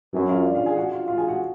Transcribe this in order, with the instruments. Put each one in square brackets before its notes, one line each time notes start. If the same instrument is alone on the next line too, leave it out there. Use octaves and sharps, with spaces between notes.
[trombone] F#2 [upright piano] C#4 C#5
[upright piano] F4 F5
D4 D5
F4 F5
G#4 G#5
F#4 F#5
F4 F5
F4 F5
G#4 G#5
F#4 F#5